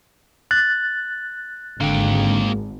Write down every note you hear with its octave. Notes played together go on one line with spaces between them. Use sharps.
F#6 A6
G#1 D3 A#3 G5